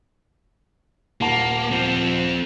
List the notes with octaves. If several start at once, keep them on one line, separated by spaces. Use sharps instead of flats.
D#1 A#3 F#5 A5
F3 C4